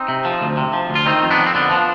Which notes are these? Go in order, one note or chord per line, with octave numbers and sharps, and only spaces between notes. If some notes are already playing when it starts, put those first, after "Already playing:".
Already playing: C4 D#4
C3
F3
D2
C3
F3
D2
F4
D#3 C4 D#4
F2
B3 D4
F2
C4
D3 B3 D4
F3